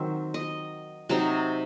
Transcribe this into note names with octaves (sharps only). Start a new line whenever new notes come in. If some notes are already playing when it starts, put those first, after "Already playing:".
Already playing: D#3 F#3 C4 E5
D#5
C3 F#3 C4 D#4